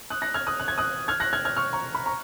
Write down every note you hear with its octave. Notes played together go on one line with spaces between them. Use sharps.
D#6 F#6
F#6 A#6
F6 G#6
D#6 F#6
F#6
G#6
D#6 F#6
F6 G#6
F#6 A#6
F6 G#6
F6 G#6
C#6 F6
A#5 C#6
B5
A#5 C#6